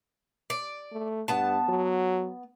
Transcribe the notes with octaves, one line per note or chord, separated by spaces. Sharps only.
D5
A3
G2 B3 A5
F#3